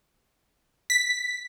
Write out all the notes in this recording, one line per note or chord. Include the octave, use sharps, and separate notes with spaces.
B6